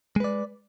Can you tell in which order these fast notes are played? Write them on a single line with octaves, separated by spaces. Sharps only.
G#3 B4 D5